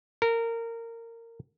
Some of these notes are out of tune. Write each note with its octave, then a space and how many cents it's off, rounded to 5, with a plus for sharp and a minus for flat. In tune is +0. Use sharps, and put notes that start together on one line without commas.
A#4 -20